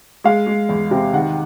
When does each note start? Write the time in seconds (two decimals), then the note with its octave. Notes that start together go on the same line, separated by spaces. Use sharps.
0.24 G#3 F5
0.47 G#3
0.69 E2
0.91 C3
1.13 D#3 F#5